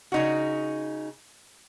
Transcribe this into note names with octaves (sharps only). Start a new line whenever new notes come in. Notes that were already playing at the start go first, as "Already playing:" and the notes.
C#3 D#4 F#4